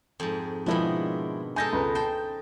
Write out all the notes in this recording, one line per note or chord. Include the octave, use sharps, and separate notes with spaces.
F2 G#2
B2 D#3 F3 G#3 D4 E4
G#3 D#4 A4 G#5 G6 A#6
C#2 B4 A#5
C5 G5 A5